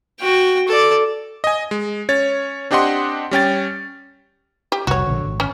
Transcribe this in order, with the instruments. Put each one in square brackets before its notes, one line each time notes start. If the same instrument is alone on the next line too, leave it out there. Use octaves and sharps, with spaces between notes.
[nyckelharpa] F#4 G5
A4 D5
[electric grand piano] D#5 G#5
G#3
C#4 C#5 A6
C4 D4 G4 D#5 F#5 C6
G3 C#4 G5 A6
[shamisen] G4
[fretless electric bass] F1 C2 [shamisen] F#4 C#5
[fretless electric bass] A#1 D3
G#1
[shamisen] C#4